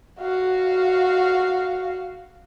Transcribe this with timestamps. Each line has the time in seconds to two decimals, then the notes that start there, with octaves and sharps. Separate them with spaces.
0.20 F#4 F5